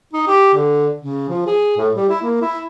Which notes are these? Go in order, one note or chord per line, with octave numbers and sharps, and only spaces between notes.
D#4
G4
D3
C#3
F3
G#4
A2
G3
E4
A#3
E4